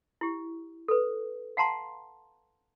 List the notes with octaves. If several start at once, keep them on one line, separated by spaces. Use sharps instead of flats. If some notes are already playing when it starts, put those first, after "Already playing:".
E4 G4
A4 B4
F5 F#5 A5 A#5 C6